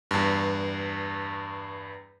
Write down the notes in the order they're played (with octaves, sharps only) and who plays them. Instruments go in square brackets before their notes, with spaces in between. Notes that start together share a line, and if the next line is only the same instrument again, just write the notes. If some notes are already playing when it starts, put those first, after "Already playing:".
[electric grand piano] E2 G2